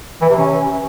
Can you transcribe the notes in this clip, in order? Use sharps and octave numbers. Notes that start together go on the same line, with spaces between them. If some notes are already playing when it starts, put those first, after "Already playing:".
E3
C3
C#4